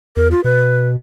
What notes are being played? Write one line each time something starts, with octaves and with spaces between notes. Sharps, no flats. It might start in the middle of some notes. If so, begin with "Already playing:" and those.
E2 A#4
F4
B2 B4